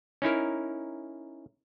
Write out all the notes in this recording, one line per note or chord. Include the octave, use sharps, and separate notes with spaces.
C#4 D#4 E4 A#4